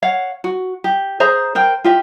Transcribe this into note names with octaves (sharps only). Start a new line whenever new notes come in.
C#5 F5 F#5
F#4
G4
G#4 C5 E5 A#5
A#4 C5 G5
F4 G4 E5